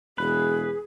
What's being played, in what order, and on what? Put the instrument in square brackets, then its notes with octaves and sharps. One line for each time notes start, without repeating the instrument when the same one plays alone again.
[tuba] E1 [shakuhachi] G#4 [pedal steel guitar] B4